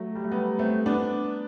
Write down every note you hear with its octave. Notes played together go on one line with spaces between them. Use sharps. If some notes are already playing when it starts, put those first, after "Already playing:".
Already playing: F#3 A3
G3
A3
G3 B3
A3 C4
B3 D4